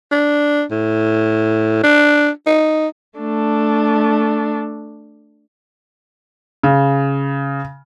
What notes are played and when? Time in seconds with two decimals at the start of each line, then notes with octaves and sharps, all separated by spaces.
0.12 D4
0.71 A2
1.84 D4
2.47 D#4
3.19 A3 D4
6.63 C#3